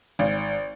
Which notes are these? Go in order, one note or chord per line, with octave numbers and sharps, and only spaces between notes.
G#1